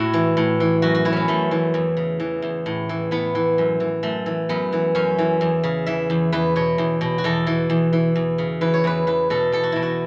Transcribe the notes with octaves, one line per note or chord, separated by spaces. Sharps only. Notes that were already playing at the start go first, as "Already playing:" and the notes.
Already playing: A2 E4 F#4
E3
A2
E3
F#2 F#4
F#4
E3 E4
B3 C#4
F#2 A3
E3
E2
C#3
E3
E2
A2
E3
A2 B3
E3
F#2
E3
F#2 A3
E3
F#2 B3
E3
F#2 C#4
E3
E2
C#3
E3 E5
E2
E2 B4
B2 C#5
E2
B2
F#4
E2 A4
E3
E2
E3
E2
C#3
E3 B4
C#5
E2 B4
E2 B4
B2 A4
E2 A4
F#4
B2 E4
F#4